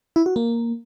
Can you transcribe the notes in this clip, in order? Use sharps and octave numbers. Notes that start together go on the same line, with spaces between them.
E4
F#4
A#3